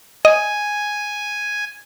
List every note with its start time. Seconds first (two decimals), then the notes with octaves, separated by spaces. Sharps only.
0.25 D#5 G#5